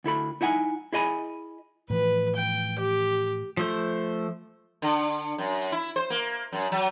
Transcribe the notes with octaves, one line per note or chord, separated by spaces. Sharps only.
D2 E4 A4 B5
D#4 E4 F#5 G#5
E4 G#4 D#5 G#5 B5
A2 E3 F3 B4
G5
G4
F3 A3 C5
D3
F#2
E4
C5
A#3
F#2
F#3